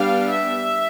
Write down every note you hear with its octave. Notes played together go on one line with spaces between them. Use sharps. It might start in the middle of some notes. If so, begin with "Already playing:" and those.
Already playing: G3 B3 D4 F5
E5